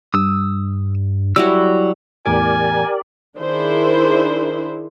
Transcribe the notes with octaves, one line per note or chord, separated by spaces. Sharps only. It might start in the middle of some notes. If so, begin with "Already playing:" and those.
G2 D#6 E6
F#3 G3 E4 F#4 E6
E2 A2 G4 A#4 D5 G#5 D6
D#3 D4 E4 G#4 C5